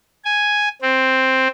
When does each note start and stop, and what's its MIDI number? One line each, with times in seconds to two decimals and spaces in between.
0.25 0.69 80
0.82 1.48 60